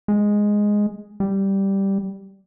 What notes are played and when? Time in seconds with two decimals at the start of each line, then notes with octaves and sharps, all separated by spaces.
0.08 G#3
1.20 G3